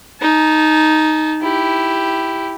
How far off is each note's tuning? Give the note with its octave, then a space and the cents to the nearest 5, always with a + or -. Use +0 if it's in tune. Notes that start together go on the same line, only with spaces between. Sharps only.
D#4 +0 A5 -30
E4 +0 G4 +0